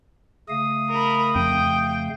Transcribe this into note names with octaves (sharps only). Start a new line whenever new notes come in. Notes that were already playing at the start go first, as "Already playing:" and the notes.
C#3 A3 F5 D#6
A#4 B5
F2 G5